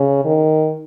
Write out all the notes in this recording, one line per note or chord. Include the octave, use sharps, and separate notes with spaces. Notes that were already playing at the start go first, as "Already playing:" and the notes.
Already playing: C#3
D#3